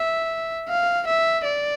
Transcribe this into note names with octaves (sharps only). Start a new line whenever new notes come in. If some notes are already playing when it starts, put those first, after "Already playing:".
Already playing: E5
F5
E5
D5